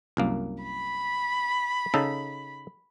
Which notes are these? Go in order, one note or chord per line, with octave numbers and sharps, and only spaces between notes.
C2 F#2 A#3
B5
C#3 D#4 A4